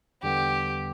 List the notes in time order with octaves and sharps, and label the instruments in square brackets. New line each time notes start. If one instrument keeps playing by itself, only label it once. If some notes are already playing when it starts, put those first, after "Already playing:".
[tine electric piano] E2 D3 G3 B3 [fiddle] G4